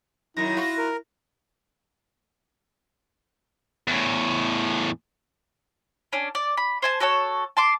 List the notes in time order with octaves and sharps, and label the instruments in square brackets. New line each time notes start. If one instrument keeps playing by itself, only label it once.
[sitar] F#2 D#3 [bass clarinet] E4 [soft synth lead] A#6
[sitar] F4 F#4
[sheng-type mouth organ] A#4
[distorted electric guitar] E2 A2
[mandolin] C#4 D4
D5
B5
C5 G#5 A5
F#4 A4 C#5 A5
A5 C6 D6